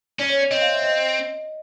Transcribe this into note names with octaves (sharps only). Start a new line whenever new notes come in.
C#4 D5
C#5
D5
C4 D#5
F5
E5
D#5